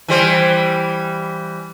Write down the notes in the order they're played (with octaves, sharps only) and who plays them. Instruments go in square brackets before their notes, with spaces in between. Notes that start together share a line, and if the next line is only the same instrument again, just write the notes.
[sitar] E3 G3 C5